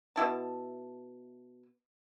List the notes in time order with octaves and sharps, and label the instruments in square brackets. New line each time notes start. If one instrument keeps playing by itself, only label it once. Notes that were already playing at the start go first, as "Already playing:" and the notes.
[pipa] B2 E4 A5